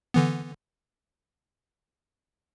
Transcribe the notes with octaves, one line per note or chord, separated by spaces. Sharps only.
D3 E3 B3